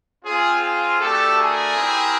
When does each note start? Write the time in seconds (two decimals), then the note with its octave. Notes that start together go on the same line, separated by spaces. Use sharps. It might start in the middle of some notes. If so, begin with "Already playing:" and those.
0.24 C4 F4 G#4
0.62 G#4
1.00 A3 D4 F#4 G4 A4
1.38 G#4 A#4
1.76 C4 E4 G4